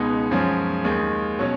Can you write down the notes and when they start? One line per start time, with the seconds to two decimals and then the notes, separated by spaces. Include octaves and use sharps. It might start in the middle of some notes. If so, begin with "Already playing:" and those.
Already playing: C#2 B2 G#3 B3 D#4
0.31 F#2 F3 G#3 C#4
0.84 D#2 D#3 G#3
1.39 B2 F#3 C#4